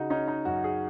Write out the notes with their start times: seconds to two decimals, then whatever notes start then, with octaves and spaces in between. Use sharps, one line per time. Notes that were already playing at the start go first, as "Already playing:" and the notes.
Already playing: C#3 D#4 F#4
0.10 C#4 D#4
0.28 D#4
0.45 F#2 F#4
0.64 G#4